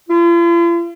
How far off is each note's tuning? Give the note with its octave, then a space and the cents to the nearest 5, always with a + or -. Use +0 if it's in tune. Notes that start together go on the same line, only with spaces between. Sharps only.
F4 -45